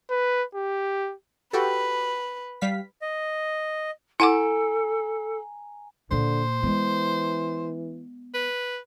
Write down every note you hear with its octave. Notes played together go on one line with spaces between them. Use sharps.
B4
G4
F#4 G4 A4 B4
G3 F5 B6
D#5
E4 A4 F#5 G#5 A#5 D6
A#2 D3 A#3 C5
E3 G#3 B3
B4